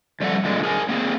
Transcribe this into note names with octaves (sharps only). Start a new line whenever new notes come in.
F2 G3 A3 A4 F#5
A#2 D3 G#3
G#4 A#4 G#5
A#3 C4 G#4